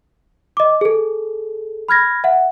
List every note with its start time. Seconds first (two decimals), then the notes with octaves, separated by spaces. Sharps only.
0.57 D#5 D6
0.81 G#4 A4
1.89 B5 F6 G#6 A#6
2.24 E5 F#5